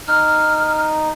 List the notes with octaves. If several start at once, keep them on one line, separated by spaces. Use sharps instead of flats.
D#4 F6